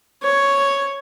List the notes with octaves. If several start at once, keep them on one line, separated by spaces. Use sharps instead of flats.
C#5